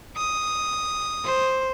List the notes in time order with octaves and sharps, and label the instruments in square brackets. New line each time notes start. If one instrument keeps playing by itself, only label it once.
[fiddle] D#6
[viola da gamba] C5